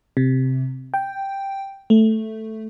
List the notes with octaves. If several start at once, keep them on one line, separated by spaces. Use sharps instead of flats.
C3
G5
A3